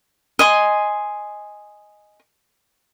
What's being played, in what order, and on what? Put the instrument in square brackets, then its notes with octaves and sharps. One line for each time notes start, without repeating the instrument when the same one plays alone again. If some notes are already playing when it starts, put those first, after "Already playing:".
[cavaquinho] D#5 G#5 C6